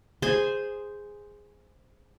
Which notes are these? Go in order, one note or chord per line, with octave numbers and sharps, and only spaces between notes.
G#4 C5 G#5